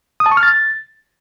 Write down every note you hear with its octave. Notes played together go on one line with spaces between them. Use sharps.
D#6
A5
C#6
F6
A6